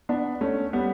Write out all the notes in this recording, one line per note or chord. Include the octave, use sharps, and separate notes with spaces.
B3 D4
A3 C#4
G3 B3